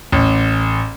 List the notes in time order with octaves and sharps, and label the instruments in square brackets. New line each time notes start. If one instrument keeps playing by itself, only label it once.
[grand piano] A1